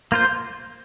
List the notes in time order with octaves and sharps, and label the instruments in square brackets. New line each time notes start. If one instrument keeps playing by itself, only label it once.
[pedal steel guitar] A#3 F4 C5